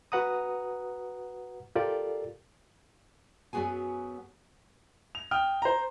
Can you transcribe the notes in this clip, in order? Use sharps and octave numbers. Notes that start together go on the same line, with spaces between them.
F#4 B4 F#5 A#5 D#6
F4 G4 A4 A#4 D5
F#2 F#3 B3 F#4 G#4 G#5
F7
G5 D#6 F6
C5 A#5